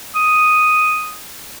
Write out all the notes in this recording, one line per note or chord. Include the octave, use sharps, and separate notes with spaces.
D#6